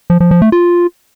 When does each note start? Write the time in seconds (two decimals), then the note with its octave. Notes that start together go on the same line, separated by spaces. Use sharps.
0.10 F3
0.20 F3
0.31 F3
0.42 A3
0.52 F4